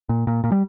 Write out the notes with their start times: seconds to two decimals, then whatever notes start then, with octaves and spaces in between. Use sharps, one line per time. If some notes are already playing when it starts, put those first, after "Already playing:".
0.09 A#2
0.27 A#2
0.44 A#2
0.52 G3